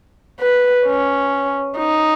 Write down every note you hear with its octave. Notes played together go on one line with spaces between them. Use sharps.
B4
C#4
D#4